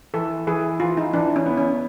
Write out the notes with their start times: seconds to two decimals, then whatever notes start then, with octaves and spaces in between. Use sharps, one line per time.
0.14 E3 A4
0.47 E3 G#4
0.80 E3 F4
0.97 D#4
1.13 E3 D4
1.36 C#4
1.46 B3
1.58 C#4